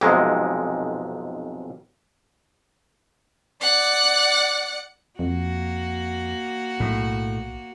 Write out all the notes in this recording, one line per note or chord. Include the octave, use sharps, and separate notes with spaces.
B1 F2 G#2 C3 G#3
D5 F#5
F2 A#3 F#4
B1 A2